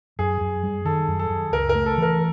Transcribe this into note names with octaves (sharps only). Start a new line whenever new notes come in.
F#2 G#4
F#2
G3
D#3 A4
F#2
A4
F#2
C#2 A#4
A#4
A3
A4
E3 A#4